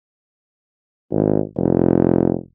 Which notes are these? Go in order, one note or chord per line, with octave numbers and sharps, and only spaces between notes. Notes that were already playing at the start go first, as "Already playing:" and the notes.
G#1
F1